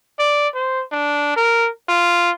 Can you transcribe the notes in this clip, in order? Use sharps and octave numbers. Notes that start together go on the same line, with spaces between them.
D5
C5
D4
A#4
F4